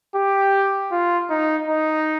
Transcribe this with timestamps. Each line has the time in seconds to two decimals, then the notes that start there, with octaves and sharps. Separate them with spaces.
0.15 G4
0.92 F4
1.30 D#4
1.68 D#4